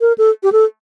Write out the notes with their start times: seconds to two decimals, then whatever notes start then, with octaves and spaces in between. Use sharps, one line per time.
0.01 A#4
0.18 A4
0.43 G4
0.52 A4